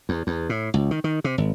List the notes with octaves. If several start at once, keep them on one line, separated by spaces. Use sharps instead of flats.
E2
E2
A2
C#2
D#3
D#3
C3
G#1